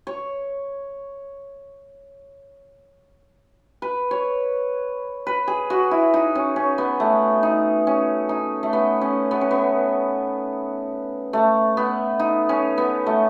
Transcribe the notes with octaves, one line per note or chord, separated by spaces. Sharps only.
C#5
B4
C#5
B4
G#4
F#4
E4
D#4
C#4
C#4
B3
A3
D#4
C#4
D#4
A3
B3
C#4
B3
C#4
B3
A3
B3
D#4
C#4
B3
A3